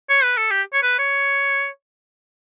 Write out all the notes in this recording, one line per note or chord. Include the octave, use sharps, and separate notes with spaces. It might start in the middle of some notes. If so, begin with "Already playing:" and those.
C#5
B4
A4
G4
C#5
B4
C#5